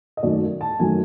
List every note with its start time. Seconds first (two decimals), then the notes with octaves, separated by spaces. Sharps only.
0.17 D#5
0.23 F#2 D#3 F#3 A3 D5
0.61 A5
0.79 F#2 D#3 F#3 A3 G#5